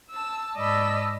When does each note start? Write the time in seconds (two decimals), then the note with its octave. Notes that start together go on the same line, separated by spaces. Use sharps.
0.10 A5 E6
0.56 G#2 D5 D#5 A5 B5 E6